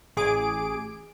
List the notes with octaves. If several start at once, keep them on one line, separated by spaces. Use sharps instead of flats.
A1 G#4 D6 D7